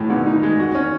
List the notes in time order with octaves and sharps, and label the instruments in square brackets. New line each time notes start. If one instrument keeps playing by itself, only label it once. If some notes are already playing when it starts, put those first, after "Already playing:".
Already playing: [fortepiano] A2 G#3
[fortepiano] B1 [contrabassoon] D#3
[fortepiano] D#4
G#3
F#4
C#4